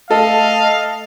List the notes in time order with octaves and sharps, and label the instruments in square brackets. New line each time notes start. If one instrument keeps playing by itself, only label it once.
[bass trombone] A3 [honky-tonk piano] A4 [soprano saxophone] D#5 [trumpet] F5